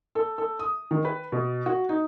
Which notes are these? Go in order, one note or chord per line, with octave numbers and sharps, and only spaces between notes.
A4
A4
D#6
D#3
B4
B2
F#4
D#4